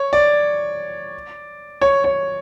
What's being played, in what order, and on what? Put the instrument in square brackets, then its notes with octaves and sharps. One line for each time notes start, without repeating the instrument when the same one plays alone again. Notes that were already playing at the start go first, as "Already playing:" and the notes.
Already playing: [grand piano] C#5
D5
C#5
C#5